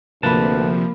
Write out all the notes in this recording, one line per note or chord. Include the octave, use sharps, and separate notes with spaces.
D2 C3 F3 A#3 B4 A5 B5